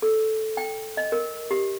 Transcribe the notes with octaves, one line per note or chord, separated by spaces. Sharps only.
A4
G5
D#5
A#4
G4